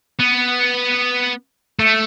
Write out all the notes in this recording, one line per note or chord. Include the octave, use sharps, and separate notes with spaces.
B3
A3